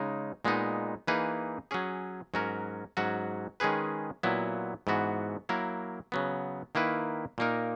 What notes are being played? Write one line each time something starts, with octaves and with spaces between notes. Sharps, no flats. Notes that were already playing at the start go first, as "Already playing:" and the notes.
Already playing: C#3 G#3 D#4
A#2 G#3 B3 D#4
E3 A#3 D#4 G#4 B4
F#3 C#4 G#4
G#2 F#3 C#4 F#4 A#4
G#2 F#3 C#4 F#4
D#3 G#3 C#4 G#4 B4
A#2 F#3 B3 E4
G#2 E3 B3 F#4
F#3 A#3 E4 A#4
C#3 F#3 B3
D#3 A#3 E4 B4
A#2 A#3 D#4 A#4